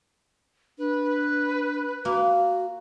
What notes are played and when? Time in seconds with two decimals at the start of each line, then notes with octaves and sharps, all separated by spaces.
0.78 D4 B4
2.05 A#3 F#4